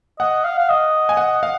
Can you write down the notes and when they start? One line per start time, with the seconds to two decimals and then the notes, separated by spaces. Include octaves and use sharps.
0.19 D#5 F#5
0.44 F5
0.58 F5
0.69 D#5
1.09 G#5
1.17 F#5
1.43 F5